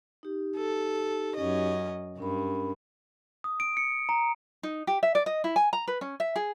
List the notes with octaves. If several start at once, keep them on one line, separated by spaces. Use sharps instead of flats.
D#4 G4
A4
F#2 C#4 D#5
G2 C#4 A#4 B5
D#6
D7
C#7
A#5
D#4
G4
E5
D5
D#5
E4
G#5
A#5
B4
C#4
E5
G#4